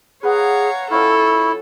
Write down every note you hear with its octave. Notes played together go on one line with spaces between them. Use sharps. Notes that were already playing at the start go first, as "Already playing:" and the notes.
G#4 B4 C#5 F5 F#5 A#5
F3 C#4 E4 A4 F5 C#6